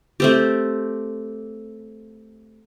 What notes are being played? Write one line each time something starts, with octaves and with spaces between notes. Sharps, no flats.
A3 C4 G4